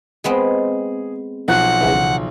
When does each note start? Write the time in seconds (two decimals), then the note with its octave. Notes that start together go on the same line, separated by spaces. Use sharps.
0.24 G#3 B3 C4 G#4
1.48 B1 F3 F#5 F#6
1.81 C#2 C#3 E3